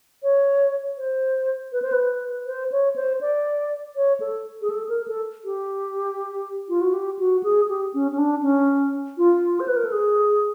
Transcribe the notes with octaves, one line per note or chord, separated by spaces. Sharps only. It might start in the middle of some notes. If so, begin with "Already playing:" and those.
C#5
C5
B4
C5
B4
C5
C#5
C5
D5
C#5
A4
G#4
A4
A#4
A4
G4
F4
F#4
G4
F#4
G#4
G4
C#4
C#4
D4
C#4
F4
C5
B4
A#4
A4
G#4